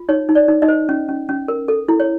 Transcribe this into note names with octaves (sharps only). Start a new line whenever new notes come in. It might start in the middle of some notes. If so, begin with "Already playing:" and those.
Already playing: F4
D#4 C#5
D#4
D5
D#4
D#4 D#5
C5
C#4
C#4
C#4
A#4
A4
E4
C#5